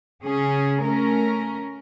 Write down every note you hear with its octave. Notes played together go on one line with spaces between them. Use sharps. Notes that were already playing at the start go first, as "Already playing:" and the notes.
C#3 C#4 G#4
A3 C#4 A#4